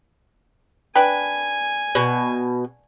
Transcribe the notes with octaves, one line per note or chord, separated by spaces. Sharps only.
D4 B4 G5 G#5
B2